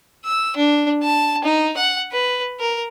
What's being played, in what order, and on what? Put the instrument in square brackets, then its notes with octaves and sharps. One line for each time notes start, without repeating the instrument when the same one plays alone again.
[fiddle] E6
D4
A5
D#4
F#5
B4
A#4